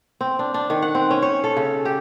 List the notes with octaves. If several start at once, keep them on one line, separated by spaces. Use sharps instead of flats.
C4
D4
D4
D#3
F#5
C4
C#4
C#5
A4
C#3
G4